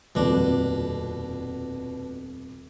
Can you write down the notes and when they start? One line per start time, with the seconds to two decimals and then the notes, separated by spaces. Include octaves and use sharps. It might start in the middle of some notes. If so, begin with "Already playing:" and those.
0.15 D#1 F2 B2 D4